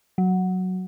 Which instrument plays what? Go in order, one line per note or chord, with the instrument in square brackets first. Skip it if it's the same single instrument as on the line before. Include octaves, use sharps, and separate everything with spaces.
[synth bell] F#3